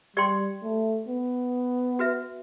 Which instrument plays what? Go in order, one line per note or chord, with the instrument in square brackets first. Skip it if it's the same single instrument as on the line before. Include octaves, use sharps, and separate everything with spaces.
[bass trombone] G3 [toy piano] G4 D5 G5 C6
[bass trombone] A3
B3
[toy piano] F#4 B4 E5